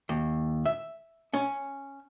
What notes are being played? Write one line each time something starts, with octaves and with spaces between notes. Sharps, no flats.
D#2
E5
C#4